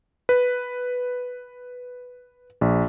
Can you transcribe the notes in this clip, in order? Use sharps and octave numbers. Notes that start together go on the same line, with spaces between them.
B4
A#1